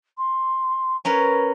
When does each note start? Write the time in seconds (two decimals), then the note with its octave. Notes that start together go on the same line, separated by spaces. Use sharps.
0.18 C6
1.05 C#4 A#4 B4 A#5